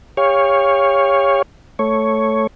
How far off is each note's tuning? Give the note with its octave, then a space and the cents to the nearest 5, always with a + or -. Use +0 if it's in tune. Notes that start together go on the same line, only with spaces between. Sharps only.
G4 +40 C#5 +0 F5 +0
A3 +0 C#5 +0